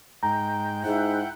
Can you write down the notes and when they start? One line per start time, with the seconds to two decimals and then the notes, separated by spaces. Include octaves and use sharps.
0.23 G#2 G5 A#5
0.84 G#2 E4 F#5 G5